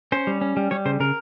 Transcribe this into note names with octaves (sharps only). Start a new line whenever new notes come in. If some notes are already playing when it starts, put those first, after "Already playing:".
C#4 C5
G3
C#4
G3
G3 C#5
C#3 C5
C#3 A#4